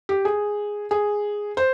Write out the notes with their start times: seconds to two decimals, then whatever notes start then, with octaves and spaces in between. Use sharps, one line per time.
0.09 G4
0.25 G#4
0.91 G#4
1.57 C5